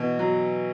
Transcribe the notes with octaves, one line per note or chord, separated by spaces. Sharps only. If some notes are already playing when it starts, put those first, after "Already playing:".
Already playing: B2 E3
F#3